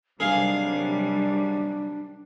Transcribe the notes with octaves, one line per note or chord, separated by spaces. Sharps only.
C3 D#3 F#3 G3 D4 G#4 F5